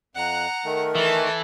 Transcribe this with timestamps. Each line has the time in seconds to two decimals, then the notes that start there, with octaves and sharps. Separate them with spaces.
0.15 F2 F#5 A#5 F#6
0.65 D#3 A3 A#4
0.96 E3 A4 A5